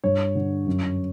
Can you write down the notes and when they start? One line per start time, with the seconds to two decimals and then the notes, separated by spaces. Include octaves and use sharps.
0.04 G2 C#5
0.35 D3
0.67 F#2